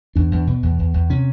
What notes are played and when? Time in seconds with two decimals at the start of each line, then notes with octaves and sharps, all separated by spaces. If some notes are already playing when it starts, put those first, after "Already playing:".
0.15 E2 D4
0.31 E2
0.47 B2
0.63 E2
0.79 E2
0.94 E2
1.10 C3 C#4